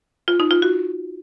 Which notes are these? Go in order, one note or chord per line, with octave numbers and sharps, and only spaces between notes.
F4
D#4
F4
F#4